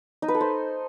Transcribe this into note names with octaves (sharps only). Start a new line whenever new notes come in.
D#4
B4
A4
C5